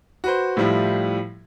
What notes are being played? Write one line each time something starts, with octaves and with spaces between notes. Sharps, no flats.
F#4 B4 C5
A2 F3 G3 E4 F4